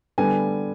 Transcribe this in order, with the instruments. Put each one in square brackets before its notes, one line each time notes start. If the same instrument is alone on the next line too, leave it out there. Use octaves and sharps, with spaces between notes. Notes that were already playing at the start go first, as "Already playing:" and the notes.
[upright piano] D3 G3 B3 G#5